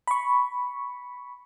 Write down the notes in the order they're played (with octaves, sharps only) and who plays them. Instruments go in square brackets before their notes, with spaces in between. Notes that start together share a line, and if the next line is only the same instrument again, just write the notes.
[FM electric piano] B5 C#6